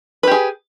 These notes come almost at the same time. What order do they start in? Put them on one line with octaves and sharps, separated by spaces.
B4 G4 G#4